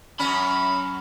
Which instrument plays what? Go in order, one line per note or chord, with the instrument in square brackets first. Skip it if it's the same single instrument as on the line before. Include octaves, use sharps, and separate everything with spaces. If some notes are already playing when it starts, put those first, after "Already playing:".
[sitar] F#2 F#3 C#4 [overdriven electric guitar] B5